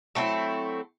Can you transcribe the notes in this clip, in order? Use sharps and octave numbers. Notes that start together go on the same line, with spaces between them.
F#3 A3 C4 E4